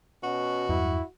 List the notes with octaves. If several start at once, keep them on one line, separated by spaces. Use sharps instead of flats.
B2 C#4 F#4
E2 G2 F#3 E4